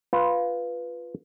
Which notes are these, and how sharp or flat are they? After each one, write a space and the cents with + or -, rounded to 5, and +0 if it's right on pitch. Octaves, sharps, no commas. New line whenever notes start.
F4 +0 B4 +0